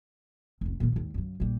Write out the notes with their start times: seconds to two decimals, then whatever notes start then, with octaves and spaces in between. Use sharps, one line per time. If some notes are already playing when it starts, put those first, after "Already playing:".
0.61 F1 C#2
0.80 A#2 D#3
0.93 D#2 G#2
1.14 F#2 C#3
1.40 A#1 G3